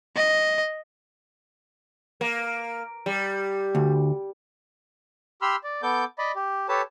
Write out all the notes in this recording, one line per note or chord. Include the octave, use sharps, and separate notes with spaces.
D#5
A#3
G3
D2
G4 B5 C6 E6 F6
D5
B3 A4 D6 G6
D5 D#5 B5
G4
G4 A4 B4 C#5 A5